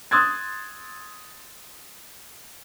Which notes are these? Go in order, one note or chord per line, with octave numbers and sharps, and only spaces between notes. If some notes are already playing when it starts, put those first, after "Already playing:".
C6 D#6 E6 F#6 G#6 A6